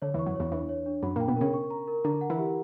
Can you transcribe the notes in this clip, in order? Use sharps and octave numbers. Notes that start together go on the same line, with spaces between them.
D3 C#5
E2 E3 C#6
F#2 F#3
E2 E3 C#5
E2 E3 D4
C#5
D4
F#2 F#3 B5
A#2 A#3 G5
B2 B3
C#3 C#4 A#4
C#6
A#5
A#4
D3 D4 A#5
F#5
E3 E4
G4